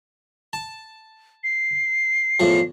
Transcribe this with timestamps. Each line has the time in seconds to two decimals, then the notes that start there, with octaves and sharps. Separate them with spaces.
0.53 A5
1.44 C7
2.40 E2 A2 F3